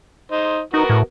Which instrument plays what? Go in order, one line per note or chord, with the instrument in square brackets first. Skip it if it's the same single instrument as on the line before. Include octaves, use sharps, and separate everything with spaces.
[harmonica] D#4 C5
[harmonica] B3 F#4 A#4 [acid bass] D#4
[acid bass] A2